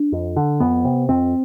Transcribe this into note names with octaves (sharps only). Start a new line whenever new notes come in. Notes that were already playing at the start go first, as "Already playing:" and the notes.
Already playing: D4
F2
D3
F2 B3
C3
F2 C4